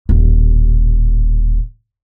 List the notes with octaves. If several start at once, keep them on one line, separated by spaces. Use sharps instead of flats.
D#1 A1